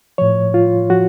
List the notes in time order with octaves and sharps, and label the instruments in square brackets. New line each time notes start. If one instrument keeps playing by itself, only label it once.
[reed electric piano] A2 F3 C#5
F4
F3 F#4